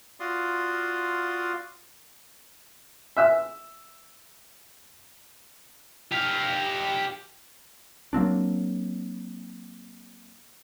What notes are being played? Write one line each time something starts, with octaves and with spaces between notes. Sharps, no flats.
F4 F#4 D5 F5 C6 D#6
E5 E6
G4 F5
F#3 A#3 C4 D4